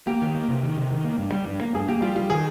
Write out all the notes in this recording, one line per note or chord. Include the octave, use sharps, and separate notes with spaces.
A#3 G4
D#3
A#3
C3
D#3
C3
D#3
A#3
G2
G3
G2
A#3
G2 G#4
A#3 G4
G3 F4
G3 F4
D#3 G#4